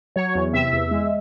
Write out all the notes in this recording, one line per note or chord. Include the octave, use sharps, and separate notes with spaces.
F#3 C#5
E2
C3 E5
E2
G#3